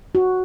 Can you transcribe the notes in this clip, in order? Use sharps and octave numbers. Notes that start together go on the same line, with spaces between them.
F#4